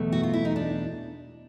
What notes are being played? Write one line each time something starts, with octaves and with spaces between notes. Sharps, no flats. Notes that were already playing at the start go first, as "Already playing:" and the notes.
Already playing: E2 B2 F#3 A3
F#4
F4
E4
D#4
D4